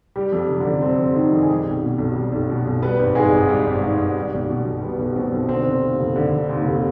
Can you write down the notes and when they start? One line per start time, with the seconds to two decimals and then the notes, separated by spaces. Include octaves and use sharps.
0.16 G3 G4
0.32 F2
0.49 C3
0.60 F2 D3 D4
0.82 G3 C4
0.98 F2
1.15 C3 D#3 D#4
1.32 F2
1.42 G#4
1.48 G3 G4
1.66 B1
1.83 B2
1.98 B1
2.16 G3
2.32 B1
2.50 B2
2.66 B1
2.82 G3 B3 B4
2.99 G#1
3.15 G#2 G#3 G#4
3.32 G#1
3.49 G3 G4
3.66 G#1
3.82 G#2
4.00 G#1
4.16 G3
4.33 B1
4.49 B2
4.66 B1
4.82 G3 B3
4.99 B1
5.16 B2 C4
5.32 B1
5.49 D3 C4
5.65 F1
5.83 D#2
5.99 F1
6.16 D3
6.33 F1
6.49 D#2
6.65 F1